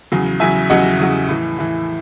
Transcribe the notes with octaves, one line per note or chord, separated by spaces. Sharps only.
E2 C#3 F#3
E2 C#3 F#3 E5 G#5
E2 C#3 F#3 D#5 F#5
E2 C#3 F#3
A2 E3
A2 E3